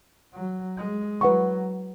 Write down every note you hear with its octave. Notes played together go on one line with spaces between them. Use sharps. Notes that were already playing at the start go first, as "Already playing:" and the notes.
F#3
G#3
F#3 B4 F#5 C#6